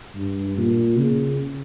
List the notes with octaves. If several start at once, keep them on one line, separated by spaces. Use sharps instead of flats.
G2
A#2
C#3